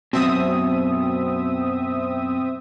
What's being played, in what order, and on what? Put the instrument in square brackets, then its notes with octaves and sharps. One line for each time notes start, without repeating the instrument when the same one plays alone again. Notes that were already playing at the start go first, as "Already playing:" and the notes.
[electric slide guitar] F#2 B2 [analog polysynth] C4 E5 D#6